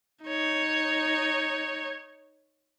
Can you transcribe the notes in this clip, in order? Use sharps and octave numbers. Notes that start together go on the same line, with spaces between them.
D#4 C#5